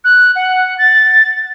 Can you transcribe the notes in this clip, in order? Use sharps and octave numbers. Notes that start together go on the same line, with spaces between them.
F#6
F#5
A6